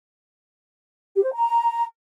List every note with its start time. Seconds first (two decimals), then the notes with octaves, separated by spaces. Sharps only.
1.15 G4
1.24 C5
1.32 A#5